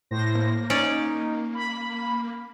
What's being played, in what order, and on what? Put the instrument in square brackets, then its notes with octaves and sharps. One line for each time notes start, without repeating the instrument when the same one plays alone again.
[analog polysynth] A2 C5 A#6
[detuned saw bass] A#3
[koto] C#4 D5 [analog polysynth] D#4
[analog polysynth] B5